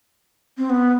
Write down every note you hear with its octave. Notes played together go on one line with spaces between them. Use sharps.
C4
B3